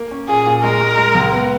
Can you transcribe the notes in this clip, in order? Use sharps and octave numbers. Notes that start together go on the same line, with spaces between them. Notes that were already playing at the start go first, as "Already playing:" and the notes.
Already playing: A#3
C#4
A#2 G#4
A#2
G#3 A#4
G#3
G#3
C#2
B3